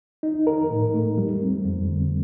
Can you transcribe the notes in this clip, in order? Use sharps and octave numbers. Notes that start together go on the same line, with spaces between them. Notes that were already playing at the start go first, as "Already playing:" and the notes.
D#4
A#4
A2
A3
G3
C4
F2
D3